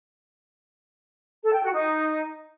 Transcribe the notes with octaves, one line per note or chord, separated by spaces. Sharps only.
A4
G5
F#4
D#4